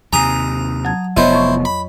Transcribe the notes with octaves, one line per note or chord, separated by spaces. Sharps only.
D#2 C3 G#5 A#5 D#6
F#3 A5 G#6
F1 B3 E4 C5 C#5 D#5
F2 C#6
B5